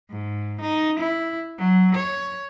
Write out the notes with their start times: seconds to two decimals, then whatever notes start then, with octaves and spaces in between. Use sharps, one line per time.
0.10 G#2
0.61 D#4
0.99 E4
1.58 F#3
1.95 C#5